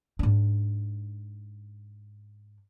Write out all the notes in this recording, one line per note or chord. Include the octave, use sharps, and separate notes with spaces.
G#2 D4